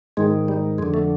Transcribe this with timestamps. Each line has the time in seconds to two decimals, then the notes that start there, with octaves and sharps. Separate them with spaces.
0.17 G#2 D#3 G#3
0.48 G3
0.78 F2 D3 G#3
0.94 A3